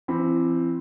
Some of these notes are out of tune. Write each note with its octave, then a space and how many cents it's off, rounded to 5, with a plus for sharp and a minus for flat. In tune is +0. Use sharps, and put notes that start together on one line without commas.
E3 +35 C4 +0 B5 +0